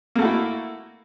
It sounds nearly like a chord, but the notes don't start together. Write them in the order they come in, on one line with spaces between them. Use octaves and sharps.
A#3 A3 F#4 E4